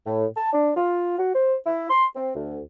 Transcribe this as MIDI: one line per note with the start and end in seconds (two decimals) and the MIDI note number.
0.06 0.25 45
0.37 0.49 81
0.53 0.71 62
0.76 1.16 65
1.18 1.34 66
1.35 1.56 72
1.66 1.87 64
1.90 2.06 84
2.16 2.31 60
2.35 2.60 38